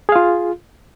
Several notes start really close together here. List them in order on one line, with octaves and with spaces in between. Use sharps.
G#4 F5 F4